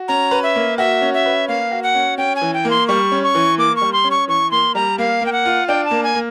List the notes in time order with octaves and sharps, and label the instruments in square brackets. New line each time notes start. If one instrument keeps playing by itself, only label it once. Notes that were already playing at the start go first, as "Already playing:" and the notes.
Already playing: [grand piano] F#4
[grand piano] C#4 [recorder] A#5
[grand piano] B4
[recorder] E5
[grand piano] A#3
[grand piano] F#4 [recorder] E5
[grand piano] C#4
[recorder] E5
[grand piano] B4
[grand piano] A#3 [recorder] F5
[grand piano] F#4
[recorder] F#5
[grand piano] C#4
[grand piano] C#4 [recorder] G5
[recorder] G#5
[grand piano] E3
[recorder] G5
[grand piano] A#3
[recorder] C6
[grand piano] G3 [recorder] C#6
[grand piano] C#4
[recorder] C#6
[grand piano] E3
[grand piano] A#3 [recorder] D6
[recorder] C#6
[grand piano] G3
[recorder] C6
[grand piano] C#4
[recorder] C#6
[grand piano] E3 [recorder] C#6
[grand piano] A#3 [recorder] C6
[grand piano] G3 [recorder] A#5
[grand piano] A#3 [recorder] F5
[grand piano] A#3 [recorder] G5
[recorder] F#5
[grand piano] F4
[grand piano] D4 [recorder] G5
[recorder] A5
[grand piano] A#3
[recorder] G#5
[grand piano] A#3